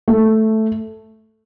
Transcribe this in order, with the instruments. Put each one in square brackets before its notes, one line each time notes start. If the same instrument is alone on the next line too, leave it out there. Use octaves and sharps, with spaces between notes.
[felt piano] A3